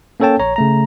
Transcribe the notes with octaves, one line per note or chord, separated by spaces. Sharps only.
A#3 C#4 A4 C#5 G5 A5
A#1 C#5 A#5
C#3 A3 A#5